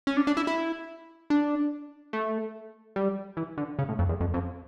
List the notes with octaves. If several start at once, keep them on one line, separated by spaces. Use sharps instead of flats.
C#4
D4
D4
E4
E4
D4
A3
G3
E3
D3
C#3
A2
F2
E2
F2
F2